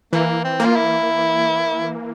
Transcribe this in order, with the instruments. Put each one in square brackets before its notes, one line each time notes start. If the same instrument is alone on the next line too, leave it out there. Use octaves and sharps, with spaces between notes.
[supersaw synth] E3 [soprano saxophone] A#3
[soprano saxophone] C4
[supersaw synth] A#3
[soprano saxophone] F4
E4